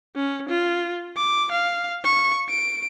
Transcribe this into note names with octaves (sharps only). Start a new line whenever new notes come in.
C#4
F4
D6
F5
C#6
D7